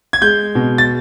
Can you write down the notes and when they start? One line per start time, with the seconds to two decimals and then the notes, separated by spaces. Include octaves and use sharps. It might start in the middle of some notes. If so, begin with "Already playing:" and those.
0.13 G#6
0.22 G#3 G6
0.55 B2
0.78 A6